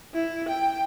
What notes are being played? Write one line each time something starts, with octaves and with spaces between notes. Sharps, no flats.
E4
G5